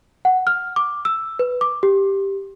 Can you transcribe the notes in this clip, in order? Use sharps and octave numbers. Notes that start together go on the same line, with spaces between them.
F#5
F6
D6
E6
B4
D6
G4